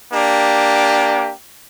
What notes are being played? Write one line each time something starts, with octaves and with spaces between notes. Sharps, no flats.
A#3 D4 G4